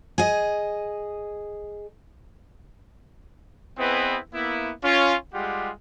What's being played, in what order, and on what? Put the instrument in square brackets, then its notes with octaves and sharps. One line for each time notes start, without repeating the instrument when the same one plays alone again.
[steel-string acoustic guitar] G#4 D#5
[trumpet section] B3 C4 E4 G#4 B4 D#5
A#3 B3 E4
C#4 F4
G3 G#3 F4 G4 F#5